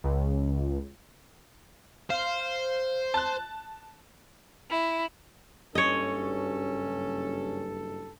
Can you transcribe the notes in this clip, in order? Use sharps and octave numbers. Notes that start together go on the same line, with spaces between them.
C#2
C5 F5
A5 F#6
E4
F#1 G2 C#4 A4 C#5 D#5